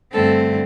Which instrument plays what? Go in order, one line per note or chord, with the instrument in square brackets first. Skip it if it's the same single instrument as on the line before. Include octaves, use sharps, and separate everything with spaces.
[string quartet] G2 D3 A3 C4 A4